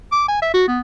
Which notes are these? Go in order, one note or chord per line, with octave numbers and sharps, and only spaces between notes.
D6
G#5
E5
F#4
B3